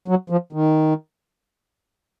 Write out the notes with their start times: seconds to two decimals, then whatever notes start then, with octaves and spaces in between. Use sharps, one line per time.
0.08 F#3
0.30 F3
0.53 D#3